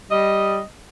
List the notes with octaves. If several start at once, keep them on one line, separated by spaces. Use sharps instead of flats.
G3 D#5